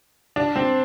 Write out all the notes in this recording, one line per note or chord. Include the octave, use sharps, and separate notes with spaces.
D4
C4